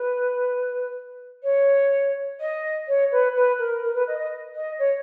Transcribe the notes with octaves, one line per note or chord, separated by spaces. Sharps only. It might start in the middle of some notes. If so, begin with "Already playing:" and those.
Already playing: B4
C#5
D#5
C#5
B4
B4
A#4
A#4
B4
D#5
D#5
D#5
C#5